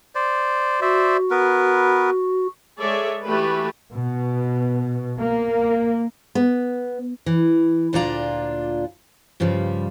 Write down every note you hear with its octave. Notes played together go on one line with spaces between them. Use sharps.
C5 D5
F#4 C5 D5 E5
B3 A#4 B4
G#3 G#4 A4 C#5 D5 E5
E3 A3 F#4 G4 B4
B2
A#3
B3
E3
D2 A#2 D4 F4 D5 A#5
G2 C#3 F3 G3